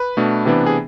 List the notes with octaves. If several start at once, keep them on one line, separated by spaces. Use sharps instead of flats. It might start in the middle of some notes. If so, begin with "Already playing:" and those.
Already playing: B4
B2 A3 D4
C3 E3 B3 D4
G#4